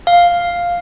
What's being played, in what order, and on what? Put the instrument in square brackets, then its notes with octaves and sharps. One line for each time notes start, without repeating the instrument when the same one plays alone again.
[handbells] F5